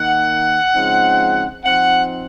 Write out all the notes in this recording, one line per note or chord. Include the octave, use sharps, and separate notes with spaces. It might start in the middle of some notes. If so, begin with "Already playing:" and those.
Already playing: D#3 A#3 D#4 F#5
C#3 F3 G#3 C4 D#4
F3 C4 D#4 F#5